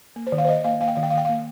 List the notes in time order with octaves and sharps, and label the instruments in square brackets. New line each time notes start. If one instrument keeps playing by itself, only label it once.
[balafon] A#3
C5
D#3
F5
C5
D#3 D#5
A#3 F5
A#3 F5
G5
D#3 F5
G5
F5
D#3 G5
A#3 F5